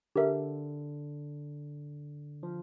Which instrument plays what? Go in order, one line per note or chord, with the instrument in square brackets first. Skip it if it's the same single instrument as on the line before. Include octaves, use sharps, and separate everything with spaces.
[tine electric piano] D3 [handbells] G4 A#4 E5
[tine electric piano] F3